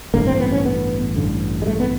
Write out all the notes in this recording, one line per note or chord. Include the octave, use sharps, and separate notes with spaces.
A1 G2 D3 A#3
C4
B3
C#4
B3
A1 G2 D3
G#3
A3
B3